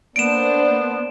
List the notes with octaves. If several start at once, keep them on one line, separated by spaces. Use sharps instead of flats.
A#3 B3 D4 C5 D7 E7